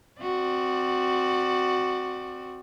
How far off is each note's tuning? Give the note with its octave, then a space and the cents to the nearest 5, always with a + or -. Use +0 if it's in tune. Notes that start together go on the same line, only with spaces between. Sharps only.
C4 -5 F#4 +0 D5 +25